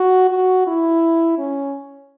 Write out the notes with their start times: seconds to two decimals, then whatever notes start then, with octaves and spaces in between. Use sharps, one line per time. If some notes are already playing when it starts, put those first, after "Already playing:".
Already playing: F#4
0.30 F#4
0.67 E4
1.38 C#4